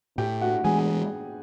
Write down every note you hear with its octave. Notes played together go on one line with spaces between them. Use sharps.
A2 G4 G5
F#4 F#5
E3 G#3 G#4 G#5
G#5